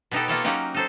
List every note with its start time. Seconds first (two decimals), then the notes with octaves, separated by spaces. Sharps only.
0.11 B2 B3 D#4 G4 A4
0.28 A#3 F4 A4 C#5
0.44 F#3 A#3 C#4 D#4 G4
0.74 D#4 A4 C5